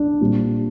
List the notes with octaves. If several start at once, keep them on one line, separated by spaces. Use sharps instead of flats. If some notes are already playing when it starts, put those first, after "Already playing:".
Already playing: D4
A#2 G3 C4